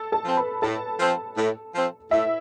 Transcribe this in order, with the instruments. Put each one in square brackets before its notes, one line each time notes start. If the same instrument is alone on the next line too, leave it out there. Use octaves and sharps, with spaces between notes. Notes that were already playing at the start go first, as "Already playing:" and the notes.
Already playing: [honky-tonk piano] A4 A5
A4 A5
[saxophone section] F3 C4
[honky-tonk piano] B4 B5
[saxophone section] A2 [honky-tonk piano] A4 A5
[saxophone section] F3 C4
A2
F3 C4
[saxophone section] A2 [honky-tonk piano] E4 E5